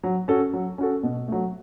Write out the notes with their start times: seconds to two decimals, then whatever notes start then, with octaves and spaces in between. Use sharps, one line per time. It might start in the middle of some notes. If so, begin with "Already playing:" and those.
0.04 F#3
0.28 C#4 F#4 A4
0.53 F#3
0.78 C#4 F#4 A4
1.03 B2
1.28 F#3 A3